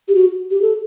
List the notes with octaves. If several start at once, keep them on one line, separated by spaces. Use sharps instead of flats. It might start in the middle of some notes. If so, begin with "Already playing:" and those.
G4
F#4
G4
A4